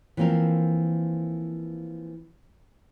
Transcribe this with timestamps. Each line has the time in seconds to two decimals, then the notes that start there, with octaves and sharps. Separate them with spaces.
0.17 E3 F3 A#3 C4 A#4